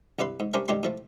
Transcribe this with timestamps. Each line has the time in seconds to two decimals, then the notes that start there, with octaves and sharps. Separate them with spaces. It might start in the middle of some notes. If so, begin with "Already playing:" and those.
0.19 C2 G2 E4 B4 C6
0.40 G#2
0.54 G3 C#4 D4 A#4 C5 E5
0.68 C#2 G2 D#3 D4 G4 C6
0.83 A2 F3 A3